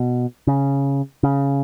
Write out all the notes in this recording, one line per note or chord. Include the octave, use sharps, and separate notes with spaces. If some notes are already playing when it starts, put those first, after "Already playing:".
Already playing: B2
C#3
C#3